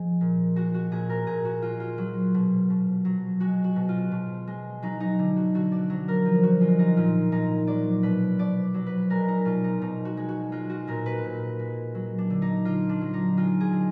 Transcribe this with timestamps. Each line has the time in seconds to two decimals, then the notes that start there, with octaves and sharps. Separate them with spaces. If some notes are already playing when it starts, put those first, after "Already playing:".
Already playing: F3 G#3 G#4
0.21 A#2
0.56 G#3 F#4
0.74 F#4
0.91 A#2 G#4
1.09 A#4
1.27 A#2 G#4
1.45 F#4
1.62 G#3 F4
1.80 F4
1.98 F#3
2.34 B2
2.70 B2
3.05 F#3
3.40 G#3 F#4
3.64 F#4
3.76 B2
3.89 F4
4.12 B2
4.47 G#3
4.82 F#3 D#4
5.00 D#4
5.19 D3
5.36 F#4
5.54 D3 F#4
5.72 D5
5.90 F#3
6.08 A#4
6.25 F3
6.43 F#4
6.61 G#3 F4
6.79 D#4
6.97 A#2 F4
7.32 A#2 D#4
7.67 F#3 D5
8.03 B2 B4
8.39 B2 D5
8.74 F#3
8.86 B4
9.10 G#3 A#4
9.28 D#4
9.45 B2 F4
9.64 D#4
9.81 B2 D#4
10.05 F#4
10.17 G#3
10.29 F#4
10.52 G#3 F4
10.70 F#4
10.87 A#2 A#4
11.06 B4
11.24 A#2
11.59 G#3
11.95 F#3
12.18 D4
12.30 D3
12.42 D#4
12.65 D3 F4
12.89 D4
13.01 F#3
13.13 D#4
13.37 G#3 F4
13.60 G#4
13.73 D3